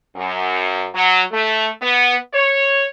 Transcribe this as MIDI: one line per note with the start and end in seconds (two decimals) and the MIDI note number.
0.16 0.87 42
0.95 1.23 54
1.32 1.69 57
1.82 2.15 59
2.34 2.85 73